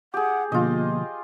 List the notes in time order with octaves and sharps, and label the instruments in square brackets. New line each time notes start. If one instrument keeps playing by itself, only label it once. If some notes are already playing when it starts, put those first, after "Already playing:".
[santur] G4 G#4 [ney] F#5
[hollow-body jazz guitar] B2 D3 F3 [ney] A#3 [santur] F4 D#5